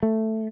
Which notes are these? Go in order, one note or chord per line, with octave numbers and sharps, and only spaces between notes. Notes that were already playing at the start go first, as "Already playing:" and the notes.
A3